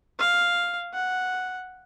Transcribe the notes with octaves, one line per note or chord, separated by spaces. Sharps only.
F5
F#5